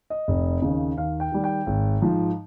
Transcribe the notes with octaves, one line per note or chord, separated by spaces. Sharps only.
D#5
F1
D#2 C#3
D#2 F5
G5
D#3 G3
G5
G#1
G#2 F3